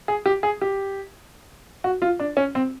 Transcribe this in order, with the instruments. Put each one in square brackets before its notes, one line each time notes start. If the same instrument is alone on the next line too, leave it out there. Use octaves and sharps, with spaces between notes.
[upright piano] G#4
G4
G#4
G4
F#4
F4
D4
C#4
C4